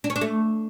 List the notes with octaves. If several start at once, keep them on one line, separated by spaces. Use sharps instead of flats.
D4
C#4
D4
A3